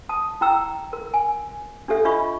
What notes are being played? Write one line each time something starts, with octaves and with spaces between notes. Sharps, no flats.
A5 D#6
E4 G5 A#5 E6
A#4
G#5
D4 G4 A4 E5
D4 F4 D#5 E5 B5 C#6